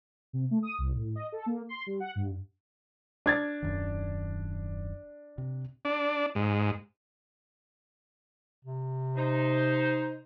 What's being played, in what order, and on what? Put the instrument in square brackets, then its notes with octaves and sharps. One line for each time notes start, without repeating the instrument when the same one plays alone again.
[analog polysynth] C3
A3
D#6
C2
A2
D#5
A4
A#3
C6
G3
F#5
G2
[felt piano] D4 G#6 A6
[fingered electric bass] D#1 F#2 D#3
C3
[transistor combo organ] D4
G#2
[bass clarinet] C3
[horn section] D#4 C5